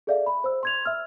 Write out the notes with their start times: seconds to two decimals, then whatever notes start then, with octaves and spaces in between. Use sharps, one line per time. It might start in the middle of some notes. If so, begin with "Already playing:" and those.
0.07 G#4 A4 D5 E5 F5
0.26 B5
0.44 C5 E6
0.63 C6 G#6 F7
0.85 E5 E6 F6